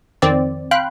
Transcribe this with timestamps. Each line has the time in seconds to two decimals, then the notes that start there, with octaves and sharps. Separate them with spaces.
0.22 F2 D#3 C4 D5
0.71 F5 G5 B5 C6 F#6